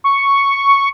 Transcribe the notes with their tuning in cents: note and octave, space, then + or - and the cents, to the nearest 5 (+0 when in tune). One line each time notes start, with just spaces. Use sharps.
C#6 +0